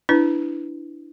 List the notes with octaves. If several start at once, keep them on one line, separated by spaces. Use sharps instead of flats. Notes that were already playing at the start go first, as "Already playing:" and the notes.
D4 E4 B4